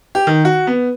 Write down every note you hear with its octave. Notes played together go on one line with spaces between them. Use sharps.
G4
D#3
F#4
B3